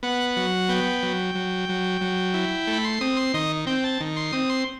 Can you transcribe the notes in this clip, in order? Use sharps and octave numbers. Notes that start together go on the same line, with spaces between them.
B3 F#5
F#3
B3 G5
F#3
F#3
F#3
F#3
E4
A3
B5
C6
C4 D#6
C6
D#3 D#5
C4 G5
A5
D#3
C6
C4 D#6
C6